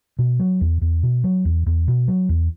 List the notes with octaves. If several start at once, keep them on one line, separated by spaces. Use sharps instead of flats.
B2
F#3
E2
E2
B2
F#3
E2
E2
B2
F#3
E2